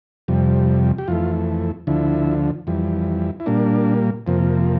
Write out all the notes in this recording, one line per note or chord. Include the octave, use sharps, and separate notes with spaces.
F2 C3 G3
G4
F2 E3 A3 F4
D2 D3 F3 E4
F2 E3 G3
E4
A#2 G3 A#3 D4
F2 C3 F3 A#3